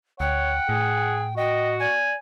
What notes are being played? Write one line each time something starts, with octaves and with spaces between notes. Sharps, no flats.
D2 C#5 F#5 G5
A2 G#4
F#4 D#5 G5
D5 G#5